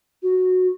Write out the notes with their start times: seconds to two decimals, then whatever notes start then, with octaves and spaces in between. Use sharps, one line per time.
0.22 F#4